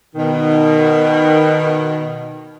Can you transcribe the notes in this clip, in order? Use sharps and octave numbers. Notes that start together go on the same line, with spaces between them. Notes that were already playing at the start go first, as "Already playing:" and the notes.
B2 D#3